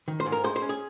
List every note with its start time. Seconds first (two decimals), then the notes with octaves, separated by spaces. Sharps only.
0.08 D#3
0.20 C5
0.26 G#2
0.32 A#4
0.44 G#3 C5
0.56 C5
0.62 C#4
0.69 G#4